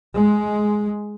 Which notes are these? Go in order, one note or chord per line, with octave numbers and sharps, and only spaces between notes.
G#3